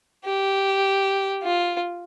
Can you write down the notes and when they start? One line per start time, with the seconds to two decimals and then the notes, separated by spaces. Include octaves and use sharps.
0.25 G4
1.43 F4